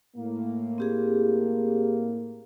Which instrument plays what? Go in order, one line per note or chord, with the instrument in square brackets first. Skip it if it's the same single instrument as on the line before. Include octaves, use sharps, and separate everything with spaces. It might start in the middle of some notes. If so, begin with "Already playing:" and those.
[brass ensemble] A2 A#3
[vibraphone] C4 G4 G#4